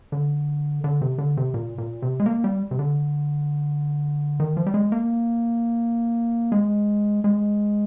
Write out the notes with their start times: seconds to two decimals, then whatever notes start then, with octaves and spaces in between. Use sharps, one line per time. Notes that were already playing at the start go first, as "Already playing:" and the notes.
0.12 D3
0.84 D3
1.02 C3
1.18 D3
1.37 C3
1.54 A#2
1.78 A#2
2.02 C3
2.20 G#3
2.26 A#3
2.44 G3
2.71 C3
2.79 D3
4.40 D#3
4.57 F3
4.66 G3
4.74 G#3
4.92 A#3
6.52 G#3
7.24 G#3